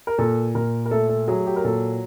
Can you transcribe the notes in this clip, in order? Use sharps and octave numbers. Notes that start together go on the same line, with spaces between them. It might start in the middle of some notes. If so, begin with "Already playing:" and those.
A#4
A#2 A4
A#2 A#4
A#4
A3 A4
A4
F#3 G#4
G4
A#4
A#2 A4